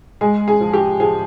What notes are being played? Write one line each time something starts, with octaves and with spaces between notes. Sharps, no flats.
G#3 G#4
G#4
F3
G4
F3 G#4